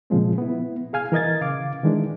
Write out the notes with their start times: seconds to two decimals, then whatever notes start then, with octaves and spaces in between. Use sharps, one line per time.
0.10 A#2 C#3 F3 G#3 C4
0.38 B3 E4
0.93 G#4 F5 G#5 F6
1.12 E3 A#4 D#5 G#6 A6
1.41 C#3 F5 D6
1.83 D#3 E3 G#3 D4